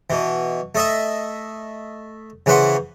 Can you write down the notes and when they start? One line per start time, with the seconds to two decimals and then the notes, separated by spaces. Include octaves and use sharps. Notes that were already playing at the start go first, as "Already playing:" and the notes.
0.10 B2 E3
0.75 A3 D#5 E5
2.46 C#3 E3 B4 C5 F#5